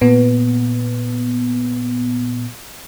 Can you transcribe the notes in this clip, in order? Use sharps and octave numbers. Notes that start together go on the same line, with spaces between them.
A#2 B3